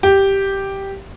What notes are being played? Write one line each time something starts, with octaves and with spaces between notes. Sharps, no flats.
G4